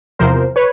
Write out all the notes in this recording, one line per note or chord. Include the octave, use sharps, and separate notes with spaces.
E2 C3 F3 A#4 C5
B4 C#5